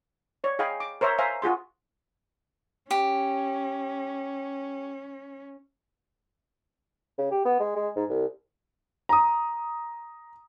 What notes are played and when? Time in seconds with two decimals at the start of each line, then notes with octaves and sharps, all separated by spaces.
0.44 C#5 D5
0.59 G#4 D#5 F5 G5 G#5 B5
0.80 D6
1.01 A#4 C5 C#5 E5 A#5
1.18 C5 E5 F5 G#5 A#5
1.42 F4 F#4 G#4 C6
2.91 C#4 G4
7.18 C#3
7.31 G4
7.45 B3
7.60 G#3
7.76 G#3
7.96 G#2
8.09 C2
9.09 A#5 D#6